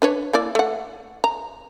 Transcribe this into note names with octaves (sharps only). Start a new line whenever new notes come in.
D4 B4 C#5
A#3 E4 D5
A3 F#5
A#5